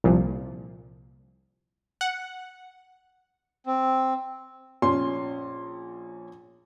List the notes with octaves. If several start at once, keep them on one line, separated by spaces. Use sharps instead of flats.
C2 A#2 F3
F#5
C4
A#1 C#4 C6